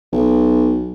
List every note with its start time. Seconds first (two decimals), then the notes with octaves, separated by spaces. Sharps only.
0.13 B1